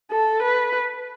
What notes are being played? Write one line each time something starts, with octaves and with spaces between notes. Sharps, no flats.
A4
B4